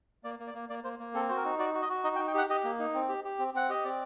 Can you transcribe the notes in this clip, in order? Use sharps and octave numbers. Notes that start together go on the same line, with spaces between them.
A#3 D5
A#3
D5
A#3
A#3 D5
A#3 C5
A#3
C4 A4
F#4 C5
A#4
D#4
F#4 D5
F#4
D#5
F#4
D#4 D#5
G5
D#4
G5
G4 F#5
G4 D#5
A#3
D#4
C4
G4
G4
C4
C4 F#5
G4 D#5
C4 D5